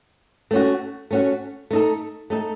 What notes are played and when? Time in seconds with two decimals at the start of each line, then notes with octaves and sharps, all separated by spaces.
0.51 A3 C#4 F#4
1.11 A3 C#4 F#4
1.71 A3 D#4 A4
2.30 A3 D#4 A4